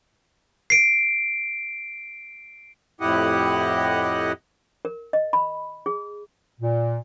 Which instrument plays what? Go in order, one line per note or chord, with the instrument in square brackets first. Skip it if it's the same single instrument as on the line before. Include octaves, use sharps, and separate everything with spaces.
[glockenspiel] C7 D7
[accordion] F2 A2 E4 G4 D#5 F#5
[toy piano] A#4
D#5
B5
G#4
[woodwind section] A#2